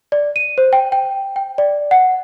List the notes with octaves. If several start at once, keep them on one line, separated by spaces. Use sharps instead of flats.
D5
D#7
C5
G5
G5
G5
D5
F#5